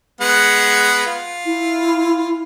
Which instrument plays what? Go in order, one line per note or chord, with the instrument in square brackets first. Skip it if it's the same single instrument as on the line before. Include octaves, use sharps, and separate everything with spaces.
[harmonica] G#3 B3 F#5
F4
[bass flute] E4